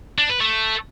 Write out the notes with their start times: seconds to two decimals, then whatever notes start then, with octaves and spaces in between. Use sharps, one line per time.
0.18 D4
0.29 B4
0.40 A3